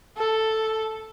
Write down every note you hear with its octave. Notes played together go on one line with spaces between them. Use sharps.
A4